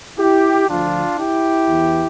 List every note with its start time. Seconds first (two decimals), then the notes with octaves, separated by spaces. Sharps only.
0.19 E4 G4
0.69 D2 D3 F3 D4 F4
1.18 E4 G4
1.68 E2 E3